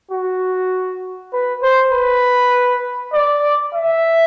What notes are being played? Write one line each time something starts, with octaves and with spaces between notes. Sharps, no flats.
F#4
B4
C5
B4
D5
E5